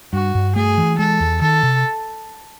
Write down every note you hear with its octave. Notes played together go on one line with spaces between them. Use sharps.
G2 F#4
G2
A3 G#4
E3
G#3 A4
E2
D#3 A4
C3